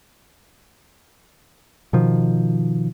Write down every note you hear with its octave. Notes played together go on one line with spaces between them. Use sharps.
B2 D#3 F3